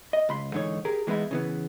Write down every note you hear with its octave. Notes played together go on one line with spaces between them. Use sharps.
D#5
C#2 B5 C6
G#2 D3 E3 D#4 C#5
G4 G#4 A#4
E3 G#3 B3 D#4 E4
C#3 E3 B3